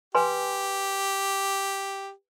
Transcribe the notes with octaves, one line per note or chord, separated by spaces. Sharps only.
G4 B4 G#5 C6